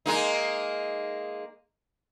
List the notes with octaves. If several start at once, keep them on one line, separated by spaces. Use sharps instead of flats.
G#3 A#3 D#4